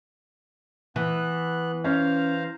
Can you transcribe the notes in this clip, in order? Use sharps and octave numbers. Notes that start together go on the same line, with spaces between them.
E3 B3 F#6
C#4 C5 F5 A#5